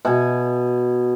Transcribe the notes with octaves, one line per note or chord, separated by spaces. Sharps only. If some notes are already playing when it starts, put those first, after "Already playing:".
B2 G#5